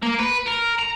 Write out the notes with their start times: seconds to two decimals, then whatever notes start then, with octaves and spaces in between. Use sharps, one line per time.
0.02 A#3
0.19 B4
0.46 A#4
0.79 A#5